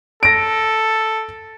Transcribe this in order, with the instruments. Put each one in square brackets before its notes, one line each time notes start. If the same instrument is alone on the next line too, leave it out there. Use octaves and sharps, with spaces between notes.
[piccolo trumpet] A4 [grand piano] A#6 D7